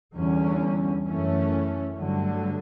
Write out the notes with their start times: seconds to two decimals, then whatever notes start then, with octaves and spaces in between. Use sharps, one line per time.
0.14 E2 D3 G3 C#4
1.06 F#2 E3 A3 C#4
1.98 G2 D3 F#3 A3